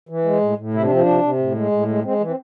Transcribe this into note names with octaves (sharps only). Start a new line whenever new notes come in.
E3
G#3
A2
A2
C3 E4
D4
F3 C4
D4
C3
C3
A2
G#3
A2
G#3
G#3 C4
E3
C4